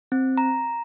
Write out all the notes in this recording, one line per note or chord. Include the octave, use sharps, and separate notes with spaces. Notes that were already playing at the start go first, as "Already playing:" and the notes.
C4
A#5